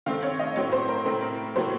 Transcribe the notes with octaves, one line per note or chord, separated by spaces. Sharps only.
D#3 A3 C4 F5
C#5
D#5
A2 F#3 C4 C#5
C5
A#4
A2 A3 C4 A#4
A2 F#3 A#3 C5